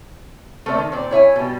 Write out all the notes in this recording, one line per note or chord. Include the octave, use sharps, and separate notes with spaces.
A3 A#3 C4 B4 D5 E5
D#3
A#2 C4 D5
E4 C#5 E5 G#5
B2 G3